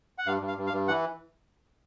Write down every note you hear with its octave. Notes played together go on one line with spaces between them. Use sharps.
F#5
G2 F5
G2
F5
G2
F5
G2
E3 F#5